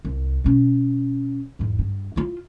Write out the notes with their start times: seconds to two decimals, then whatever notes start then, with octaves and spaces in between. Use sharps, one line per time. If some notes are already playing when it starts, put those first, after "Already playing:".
0.05 C2
0.44 B2 C#4
1.59 E2 G#2
1.79 G2
2.16 E4 F4